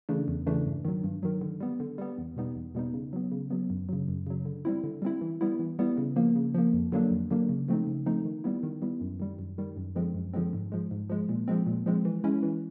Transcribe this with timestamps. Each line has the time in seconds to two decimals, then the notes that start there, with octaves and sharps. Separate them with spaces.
0.09 C#3 E3 A3 D4
0.28 E2
0.47 C#3 E3 A3 D4
0.66 G2
0.85 D#3 F#3
1.04 G2
1.23 D#3 F#3
1.41 D3
1.61 G3 B3
1.80 D3
1.98 G3 B3
2.18 E2
2.36 B2 G3 B3 D#4
2.56 E2
2.75 B2 G3 B3 D#4
2.94 C#3
3.13 F#3 B3
3.32 C#3
3.50 F#3 B3
3.70 F#2
3.89 C#3 F#3
4.08 F#2
4.27 C#3 F#3
4.45 D3
4.65 G3 C4 E4
4.84 D3
5.02 G3 C4 E4
5.21 E3
5.41 G3 B3 E4
5.59 E3
5.79 G3 B3 E4
5.98 C#3
6.16 F3 A#3
6.36 C#3
6.54 F3 A#3
6.73 F2
6.92 D3 F#3 A#3 D4
7.11 F2
7.31 D3 F#3 A#3 D4
7.49 C#3
7.68 F3 A3 C4 D#4
7.87 C#3
8.06 F3 A3 C4 D#4
8.25 D#3
8.44 G3 B3 E4
8.63 D#3
8.82 G3 B3 E4
9.01 F#2
9.20 D#3 G3
9.39 F#2
9.58 D#3 G3
9.76 F#2
9.95 D3 F3 G#3 C4
10.15 F#2
10.34 D3 F3 G#3 C4
10.53 G#2
10.72 F3 G#3
10.91 G#2
11.10 F3 G#3
11.29 A#2
11.48 F3 G#3 C4
11.67 A#2
11.86 F3 G#3 C4
12.05 E3
12.24 G#3 C#4 E4
12.43 E3